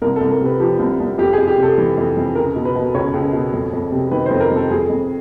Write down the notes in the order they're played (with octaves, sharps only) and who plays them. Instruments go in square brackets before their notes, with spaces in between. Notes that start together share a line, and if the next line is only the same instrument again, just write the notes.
[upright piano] C2 A#4
C2 A4
A#4
C3 B4
F3 G4
C2
C2
F2 G4
G#4
F2
G4
C3 A4
E3
F2
F2
C#2 A#4
B2
B4
B2
C#2 C#5
C#2
B2
F2
F2
C3
D#3 B4
F2 C5
A#4
F2 A4
F2 G#4
F2